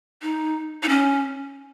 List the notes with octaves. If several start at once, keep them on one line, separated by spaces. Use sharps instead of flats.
D#4
D#4
C#4